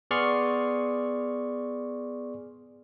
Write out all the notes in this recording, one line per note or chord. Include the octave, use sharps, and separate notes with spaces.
B3 G#4 D5 C6 C#6 F6